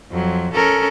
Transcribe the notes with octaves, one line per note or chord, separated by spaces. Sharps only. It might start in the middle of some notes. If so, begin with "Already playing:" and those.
F2 F#3
C#4 A4 A#4